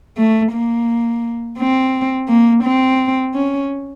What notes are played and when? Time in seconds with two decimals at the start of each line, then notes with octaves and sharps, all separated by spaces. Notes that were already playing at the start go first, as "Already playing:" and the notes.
0.17 A3
0.52 A#3
1.58 C4
2.28 A#3
2.64 C4
3.34 C#4